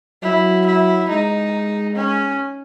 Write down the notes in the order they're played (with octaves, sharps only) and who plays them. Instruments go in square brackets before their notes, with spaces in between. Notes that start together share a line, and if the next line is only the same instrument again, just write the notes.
[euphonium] F#3 [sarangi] E4
[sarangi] E4
[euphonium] G#3 [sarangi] D#4
[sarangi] C#4